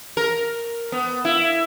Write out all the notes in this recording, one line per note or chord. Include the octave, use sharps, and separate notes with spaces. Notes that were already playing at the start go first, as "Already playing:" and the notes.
A#4
B3
E4